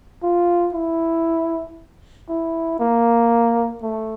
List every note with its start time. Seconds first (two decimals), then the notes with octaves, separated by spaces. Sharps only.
0.23 F4
0.74 E4
2.29 E4
2.79 A#3
3.82 A3